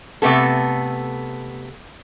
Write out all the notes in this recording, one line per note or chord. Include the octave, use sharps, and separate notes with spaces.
C3 A3 B3 A4